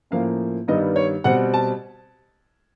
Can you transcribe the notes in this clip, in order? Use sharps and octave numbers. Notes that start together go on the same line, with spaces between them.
A2 F3 A#3 C#4 F5
G2 D#3 G3 B3 D#5
C#5
B2 G3 C4 F#5
A5